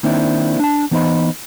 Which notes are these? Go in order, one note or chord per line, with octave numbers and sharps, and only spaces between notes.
D#3 A#3 C4 D4 E4
D4 A5
E3 B3 D#4 C5 D#5 B5